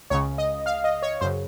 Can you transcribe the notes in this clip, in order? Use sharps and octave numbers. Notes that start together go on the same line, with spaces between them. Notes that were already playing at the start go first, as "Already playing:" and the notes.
C#2 C#3 C#5
D#5
F5
D#5
C#5
F#2 C#3 C5